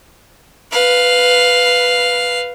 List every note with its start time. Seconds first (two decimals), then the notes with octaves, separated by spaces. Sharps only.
0.72 B4 F5